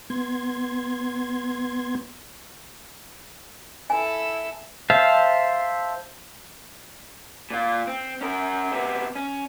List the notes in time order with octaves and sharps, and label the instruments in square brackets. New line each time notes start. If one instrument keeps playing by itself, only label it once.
[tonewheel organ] B3 C6 G#6
[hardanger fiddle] E4 A4 [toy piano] G#5
[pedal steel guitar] C5 E5 F5 A5
[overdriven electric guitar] A#2 F4
C4
C#4 A#4
C3 B3
C#4